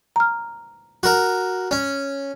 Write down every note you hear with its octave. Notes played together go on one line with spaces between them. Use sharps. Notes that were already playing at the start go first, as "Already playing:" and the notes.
A#5 F6
F#4 A#4
C#4